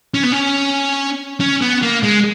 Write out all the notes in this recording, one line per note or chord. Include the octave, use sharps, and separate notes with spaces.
C#4
B3
C#4
C#4
B3
A#3
G#3